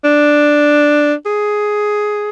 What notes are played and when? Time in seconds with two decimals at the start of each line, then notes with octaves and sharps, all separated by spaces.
0.04 D4
1.26 G#4